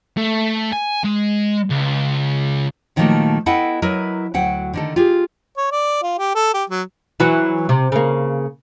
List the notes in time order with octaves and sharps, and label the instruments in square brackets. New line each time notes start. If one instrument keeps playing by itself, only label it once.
[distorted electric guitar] A3
G#5
G#3
C#2
[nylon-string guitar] A#2 D#3 F3 F#3 A3 A#3
B3 E4 A4 D#5 F#5 G5
F#3 E4 A#4 B4 D#5
D2 F#3 F#5 G5
D3 D#3 A4
F4 G4 G#4
[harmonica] C#5
D5
F4
G4
A4
G4
F#3
[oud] E3 F#3 F#4
C3
C#3 A#3